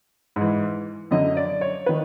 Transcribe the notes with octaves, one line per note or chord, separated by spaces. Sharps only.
G#2 E3
F#2 D3 D#5
D5
C#5
D#3 B4